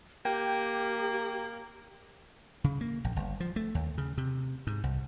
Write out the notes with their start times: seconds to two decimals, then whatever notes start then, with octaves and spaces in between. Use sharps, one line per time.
0.25 A#3 G4 G5
2.64 C#3
2.81 A#3
3.04 A#1
3.16 G1
3.40 F3
3.56 A3
3.75 D#2
3.98 C#3
4.18 C3
4.67 G#2
4.84 C2